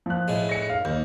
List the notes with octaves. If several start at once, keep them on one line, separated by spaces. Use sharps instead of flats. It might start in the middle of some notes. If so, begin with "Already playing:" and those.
F3 F#6
A2 G#3
A#6 C#7
F5
D#2 G6